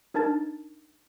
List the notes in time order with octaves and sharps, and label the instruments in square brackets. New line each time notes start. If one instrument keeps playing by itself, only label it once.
[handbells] D4 D#4 A#4 A5 A6